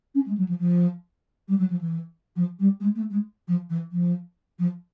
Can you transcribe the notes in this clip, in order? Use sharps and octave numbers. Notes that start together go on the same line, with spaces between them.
C#4
G#3
F#3
F3
F3
G3
F#3
F3
E3
F3
G3
G#3
A3
G#3
F3
E3
F3
F3